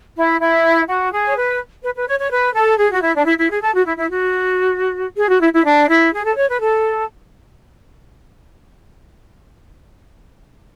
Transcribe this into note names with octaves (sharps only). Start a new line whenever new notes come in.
E4
E4
F#4
G#4
C#5
B4
B4
B4
C#5
C#5
B4
A4
G#4
F#4
E4
D4
E4
E4
G#4
A4
F#4
E4
E4
F#4
G#4
F#4
E4
E4
D4
E4
G#4
A4
C#5
B4
A4